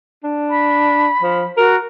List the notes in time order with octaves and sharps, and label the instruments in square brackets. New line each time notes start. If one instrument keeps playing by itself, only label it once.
[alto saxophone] D4
[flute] B5
[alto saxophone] F3
[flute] F#4 [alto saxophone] A#4